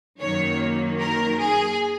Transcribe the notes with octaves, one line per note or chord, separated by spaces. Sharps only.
F#2 D#3 F#3 A#3 C#5
A#4
G#4